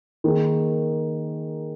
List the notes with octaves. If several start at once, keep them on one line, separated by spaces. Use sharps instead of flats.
D#3 A#3 D#4 G#4